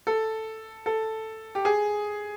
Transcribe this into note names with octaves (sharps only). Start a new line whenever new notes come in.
A4
A4
G4
G#4